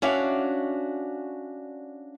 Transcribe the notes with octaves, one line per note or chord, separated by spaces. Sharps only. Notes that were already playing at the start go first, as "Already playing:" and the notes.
C#4 D4 F#4 D5 E5 F5